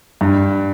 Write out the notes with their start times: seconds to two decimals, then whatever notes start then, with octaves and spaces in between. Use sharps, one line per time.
0.21 G2